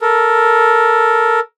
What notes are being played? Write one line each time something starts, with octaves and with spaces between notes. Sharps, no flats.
A4 A#4